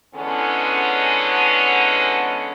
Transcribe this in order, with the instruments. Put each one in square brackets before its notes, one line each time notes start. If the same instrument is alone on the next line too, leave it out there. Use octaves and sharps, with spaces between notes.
[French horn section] D3 E3 G#3 B3 C#4